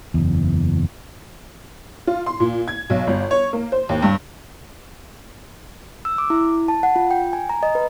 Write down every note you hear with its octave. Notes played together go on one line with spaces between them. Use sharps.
F#1 E2
F4
C6
A#2
G#6
B1
G1
C#5
A#3
C5
D#2
G2
E6
D6
E4
A5
F#5
F4
G5
G#5
A#5
D#5
B4